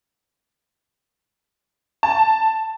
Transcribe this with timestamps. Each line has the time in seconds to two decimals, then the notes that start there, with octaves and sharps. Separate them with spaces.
2.03 A5